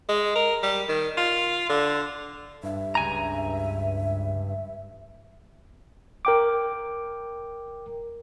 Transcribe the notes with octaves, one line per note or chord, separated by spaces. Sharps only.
G#3
A#4
G3
D#3
F4
D3
G2 E5
C#2 G#5 A#5
A#4 G5 D6